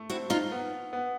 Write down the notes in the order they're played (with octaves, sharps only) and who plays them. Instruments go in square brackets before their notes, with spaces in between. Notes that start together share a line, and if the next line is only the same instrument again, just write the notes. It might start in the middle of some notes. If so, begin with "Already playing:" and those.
Already playing: [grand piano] A3
[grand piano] C4 [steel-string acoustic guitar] E4 F#4
[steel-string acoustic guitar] D#4 F4
[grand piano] B3
B3